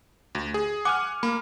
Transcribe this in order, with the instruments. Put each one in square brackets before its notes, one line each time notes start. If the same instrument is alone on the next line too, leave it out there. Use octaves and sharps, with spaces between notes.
[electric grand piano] D2
G#4
[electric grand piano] F#5 G#5 F6 [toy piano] D6
[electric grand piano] A#3 [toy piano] B5